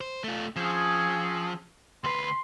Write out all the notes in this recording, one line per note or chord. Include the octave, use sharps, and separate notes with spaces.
C5
A3 F4
F3 C4 C#4 G#4
D2 B4 C6